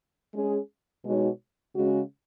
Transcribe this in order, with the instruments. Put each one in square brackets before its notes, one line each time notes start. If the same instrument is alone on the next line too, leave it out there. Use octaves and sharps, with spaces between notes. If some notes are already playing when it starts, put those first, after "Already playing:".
[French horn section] G#3 C#4 G#4
B2 G#3 D#4 F#4 C#5
C#3 G#3 C#4 F#4